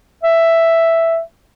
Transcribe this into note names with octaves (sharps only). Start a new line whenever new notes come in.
E5